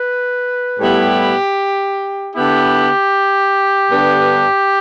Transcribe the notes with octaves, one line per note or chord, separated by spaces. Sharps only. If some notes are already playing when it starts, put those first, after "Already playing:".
Already playing: B4
A2 G3 B3 E4 G4
D3 B3 E4 G4
G2 D3 B3 D4